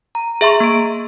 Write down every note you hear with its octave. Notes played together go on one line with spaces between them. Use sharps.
A#5
G#4 E5 A#5 C6 C#6
A#3 D7